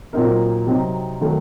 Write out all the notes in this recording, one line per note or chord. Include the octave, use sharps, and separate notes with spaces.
A#2 F#3 C4 D#4 A#4
C3 F#3 C4 D#4
D#3 F#3 A3